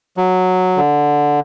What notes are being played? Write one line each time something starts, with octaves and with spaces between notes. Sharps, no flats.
F#3
D3